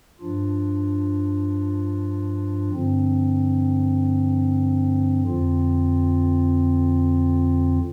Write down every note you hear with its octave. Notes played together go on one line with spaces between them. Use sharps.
G2 F3 D4 F4
G2 D3 F3 C4
F2 D3 F3 C4 F4